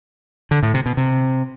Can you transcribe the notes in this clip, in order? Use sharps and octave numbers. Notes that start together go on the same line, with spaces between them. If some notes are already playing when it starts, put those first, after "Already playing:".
D3
A2
C3
B2
C3